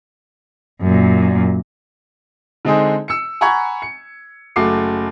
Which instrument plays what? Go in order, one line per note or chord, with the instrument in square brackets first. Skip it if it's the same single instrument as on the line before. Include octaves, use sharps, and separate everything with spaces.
[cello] F#2 A#2
[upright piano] D3 G#3 C4 D#4 G#4 C5
E6 C#7
F#5 G#5 A#5 B5 C#6 G#6
C#7
F#1 A3 F#4 D6 C7